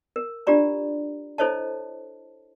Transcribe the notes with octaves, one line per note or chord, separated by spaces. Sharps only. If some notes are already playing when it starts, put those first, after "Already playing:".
A#4
D4 F4 G4 D5 A#5
E4 A4 C5 C#5 D#5 A5